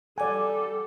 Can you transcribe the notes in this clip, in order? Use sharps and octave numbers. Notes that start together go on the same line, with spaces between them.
G3 A4 D5 F#5 G#5 D6